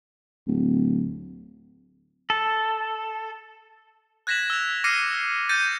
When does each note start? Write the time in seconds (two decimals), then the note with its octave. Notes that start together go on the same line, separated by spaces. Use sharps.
0.47 D1
2.30 A4
4.27 F#6 G#6 A#6 B6 E7 F#7
4.50 E6 F7
4.84 D6 F6 A#6 C7 C#7 D#7
5.49 G6 A6 A#6 C#7 D#7